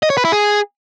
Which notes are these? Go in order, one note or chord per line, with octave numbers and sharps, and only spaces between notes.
D#5
C#5
B4
E4
G#4